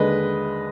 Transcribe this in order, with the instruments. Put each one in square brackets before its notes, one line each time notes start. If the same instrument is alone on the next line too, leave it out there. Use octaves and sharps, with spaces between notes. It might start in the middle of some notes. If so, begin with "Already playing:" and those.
Already playing: [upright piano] D#2 D3 G#3 B4 D#5